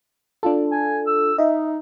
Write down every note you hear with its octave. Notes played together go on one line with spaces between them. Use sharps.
D4 F4 A4
G#5
E6
D#4 D#5 E5